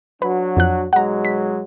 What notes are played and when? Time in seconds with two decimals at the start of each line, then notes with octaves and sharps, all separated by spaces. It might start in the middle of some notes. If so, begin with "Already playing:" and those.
0.22 F#3 D4 F#4 B4
0.56 F2 F3 F#6
0.93 B1 F#3 G#3 F#5 A#5
1.25 B6